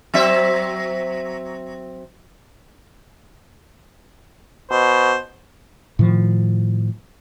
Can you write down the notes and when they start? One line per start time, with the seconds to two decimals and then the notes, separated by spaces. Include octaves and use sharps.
0.14 F#3 C4 E5
4.71 B2 C5
5.99 A2 D#3 F3